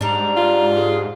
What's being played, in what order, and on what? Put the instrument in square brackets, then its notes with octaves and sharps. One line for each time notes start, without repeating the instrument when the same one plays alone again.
[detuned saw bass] G#2 [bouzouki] G3 D4 [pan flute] A#5
[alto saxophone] F4
[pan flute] G#4